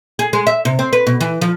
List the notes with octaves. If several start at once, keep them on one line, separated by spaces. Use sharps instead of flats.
G#4
G#3
E5
C3
C4
B4
B2
E3
F3